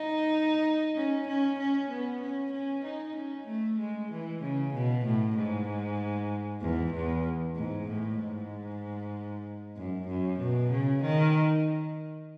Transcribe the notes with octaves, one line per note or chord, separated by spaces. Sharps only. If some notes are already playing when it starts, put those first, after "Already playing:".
Already playing: D#4
C#4
C#4
C#4
B3
C#4
C#4
D#4
C#4
A3
G#3
E3
C#3
B2
A2
G#2
E2
E2
G#2
A2
G#2
F#2
F#2
B2
C#3
D#3